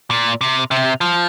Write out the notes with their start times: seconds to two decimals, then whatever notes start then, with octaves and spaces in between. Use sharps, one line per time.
0.11 A#2
0.41 C3
0.71 C3
1.01 F3